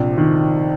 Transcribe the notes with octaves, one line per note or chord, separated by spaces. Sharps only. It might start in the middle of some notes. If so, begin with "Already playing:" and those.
Already playing: A#1 C3 F3
D#3